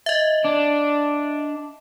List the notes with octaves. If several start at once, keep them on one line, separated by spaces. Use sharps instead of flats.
D#5 E5
D4